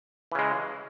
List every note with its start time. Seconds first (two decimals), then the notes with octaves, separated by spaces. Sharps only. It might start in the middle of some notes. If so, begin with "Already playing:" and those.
0.32 E3
0.35 C#3
0.39 G#3